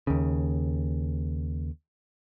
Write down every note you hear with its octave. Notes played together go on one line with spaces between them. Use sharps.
D#2 C#3